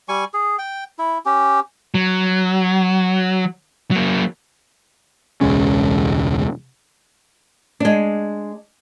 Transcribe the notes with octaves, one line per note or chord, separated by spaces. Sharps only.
G3 G#5 C#6
G#4
G5
E4
C#4 G4
F#3
F#3 A#3
E1 C#2 G#3 C#4
G#3 D4